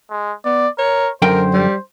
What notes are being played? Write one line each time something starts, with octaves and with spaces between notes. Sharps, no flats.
G#3
B3 D5
A#4 C#5
F#2 D3 A#4 C5 G5
G3